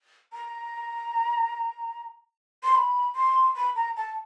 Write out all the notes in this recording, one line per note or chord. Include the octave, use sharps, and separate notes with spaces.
A#5
C6
B5
C6
B5
A#5
A5